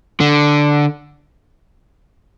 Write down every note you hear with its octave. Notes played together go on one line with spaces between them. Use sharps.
D3